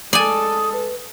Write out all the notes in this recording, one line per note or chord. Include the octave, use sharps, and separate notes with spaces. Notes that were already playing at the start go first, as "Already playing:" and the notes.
G#3 A4 D5 G#5 D#6
B4